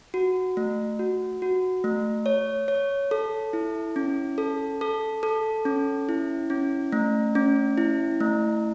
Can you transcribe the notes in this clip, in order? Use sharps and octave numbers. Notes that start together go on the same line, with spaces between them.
F#4
A3
F#4
F#4
A3
C#5
C#5
A4
E4
C#4
A4
A4
A4
C#4
E4
C#4
A3
C#4
E4
A3